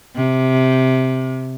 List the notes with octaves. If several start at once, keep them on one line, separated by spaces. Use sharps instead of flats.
C3